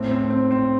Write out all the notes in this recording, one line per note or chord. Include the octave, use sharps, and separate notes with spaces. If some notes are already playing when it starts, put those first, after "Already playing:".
Already playing: A2 C4
C4
C4
C4